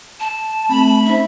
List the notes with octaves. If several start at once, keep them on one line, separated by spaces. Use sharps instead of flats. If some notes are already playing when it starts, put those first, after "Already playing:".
A5
A3 C4 B5
C#4 D#4 C5 E5